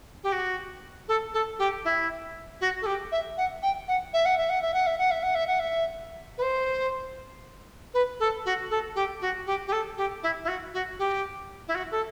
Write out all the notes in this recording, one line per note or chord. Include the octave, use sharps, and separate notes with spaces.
G4
F#4
A4
A4
G4
E4
F#4
A4
G4
E5
F#5
G5
F#5
E5
F#5
E5
F#5
E5
F#5
E5
F#5
E5
F#5
E5
F#5
E5
B4
C5
B4
A4
F#4
A4
G4
F#4
G4
G4
A4
G4
E4
E4
F#4
F#4
G4
E4
F#4
A4